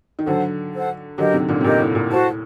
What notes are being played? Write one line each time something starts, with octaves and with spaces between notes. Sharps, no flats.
D#3
D3 F#3 A4 C5 F#5
A4 C5 F#5
D3 F#3 G4 A#4 D#5
C3 D#3
A#2 D3
C3
A#2 G4 A#4 D#5
A2
A#2
A2 F#4 C5 F#5 A5